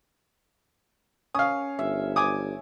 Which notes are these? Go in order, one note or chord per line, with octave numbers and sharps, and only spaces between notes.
C#4 F5 D#6
G1 E5
G#5 D6 D#6